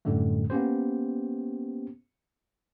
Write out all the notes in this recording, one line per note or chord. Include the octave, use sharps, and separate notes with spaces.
F#2 A2 D3 G3 A3
A#3 B3 C#4 G4 C5